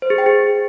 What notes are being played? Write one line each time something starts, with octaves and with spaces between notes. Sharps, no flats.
C5
G#4
G5
G#4